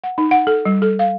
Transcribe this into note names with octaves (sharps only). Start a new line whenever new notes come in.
F#5
D#4
F#5
A4
G3
A4
F5